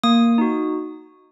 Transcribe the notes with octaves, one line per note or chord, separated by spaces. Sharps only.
A#3 D#6
D#4 F#4